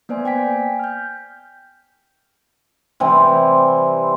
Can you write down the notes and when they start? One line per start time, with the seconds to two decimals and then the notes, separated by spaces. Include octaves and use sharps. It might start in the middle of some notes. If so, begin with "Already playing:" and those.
0.09 A#3 B3 C5 D5 G#5
0.25 G5 G#5 B6
0.79 F6 G6
3.00 C3 E3 G3 C4